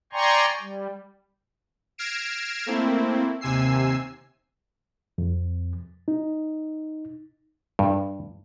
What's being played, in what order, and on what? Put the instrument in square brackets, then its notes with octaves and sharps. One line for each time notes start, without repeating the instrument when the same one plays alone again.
[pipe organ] D5 G5 G#5 A#5 C6 C#6
G3
[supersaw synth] F6 G#6 A#6 C7 D7 E7
A3 A#3 C4 E4
D#2 C3 G#5 E6 C7
[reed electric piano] F2
D#4
[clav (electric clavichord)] G2